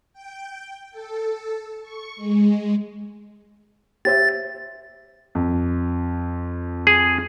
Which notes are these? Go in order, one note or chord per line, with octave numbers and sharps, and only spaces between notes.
G5
A4
C#6
G#3
G4 C5 E5 A6
F2
G#4